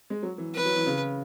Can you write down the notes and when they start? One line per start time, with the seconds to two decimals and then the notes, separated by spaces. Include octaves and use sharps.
0.10 G#3
0.23 F#3
0.38 E3
0.54 E3 B4
0.65 F#3
0.76 E3
0.86 C#3